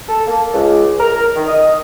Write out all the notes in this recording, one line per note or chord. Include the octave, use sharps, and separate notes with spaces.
A4
A#3
C#2
A#4
D#3
D#5